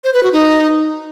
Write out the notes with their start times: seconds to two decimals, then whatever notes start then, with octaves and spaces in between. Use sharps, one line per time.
0.04 C5
0.14 B4
0.23 F#4
0.33 D#4